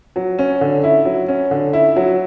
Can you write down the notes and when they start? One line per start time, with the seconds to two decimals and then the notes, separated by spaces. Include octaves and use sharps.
0.16 F#3
0.39 C#4
0.61 D3
0.84 E4
1.05 F#3
1.28 C#4
1.51 D3
1.73 E4
1.96 F#3